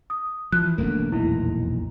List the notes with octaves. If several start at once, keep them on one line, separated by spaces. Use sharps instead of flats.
D#6
E3 F3 F#6
E1 B1 E2 D3 A3 A#3
F2 A#2 D#4 E4